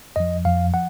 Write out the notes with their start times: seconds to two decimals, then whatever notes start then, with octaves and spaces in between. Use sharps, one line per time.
0.16 F2 F3 D#5
0.45 F2 F3 F5
0.74 F3 F#5